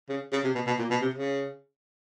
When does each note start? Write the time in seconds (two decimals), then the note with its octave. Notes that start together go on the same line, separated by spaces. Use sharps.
0.09 C#3
0.32 C#3
0.44 C3
0.55 B2
0.67 B2
0.79 A#2
0.90 B2
1.01 C3
1.14 C#3